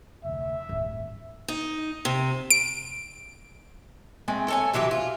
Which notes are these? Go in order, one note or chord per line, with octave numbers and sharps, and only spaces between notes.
F1 D2 E5
D1 G#1 G2
D#4
C3
D7
G#3 A3 C4
A4 C#5 G#5
C3 E3 F#3 G4
F4